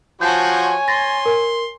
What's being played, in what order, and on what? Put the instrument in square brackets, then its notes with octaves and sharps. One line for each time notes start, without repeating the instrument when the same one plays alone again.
[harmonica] F3 F#4 C5 [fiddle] C#5 G#5 [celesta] A5 G6
[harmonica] C6 [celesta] A6 A#6
[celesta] A#4